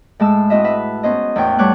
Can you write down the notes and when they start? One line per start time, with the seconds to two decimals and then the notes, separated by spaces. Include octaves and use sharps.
0.19 A2 G#3 A5 E6
0.50 C4 E4 F#4 D#5 E5
0.64 B4 E5
1.03 B3 C#4 C5 D#5
1.36 E2 A2 E3 C#5 G5
1.58 G3 A3 B3 C#5 D6 F#6